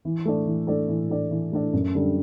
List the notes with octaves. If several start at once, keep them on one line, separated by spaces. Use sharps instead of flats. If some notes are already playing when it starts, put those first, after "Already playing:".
E3
A3 D4 A4 D5
E3
A3 D4 A4 D5
E3
A3 D4 A4 D5
E3
A3 D4 A4 D5
F#2
D3 G3 D4 A4